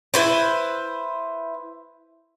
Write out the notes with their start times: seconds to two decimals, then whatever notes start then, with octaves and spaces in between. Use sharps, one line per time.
0.14 E4 B4 C5